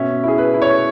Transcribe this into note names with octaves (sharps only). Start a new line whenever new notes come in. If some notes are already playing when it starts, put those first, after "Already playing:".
Already playing: B2 C#4 E5
E4 G#4
B4
E4
C#5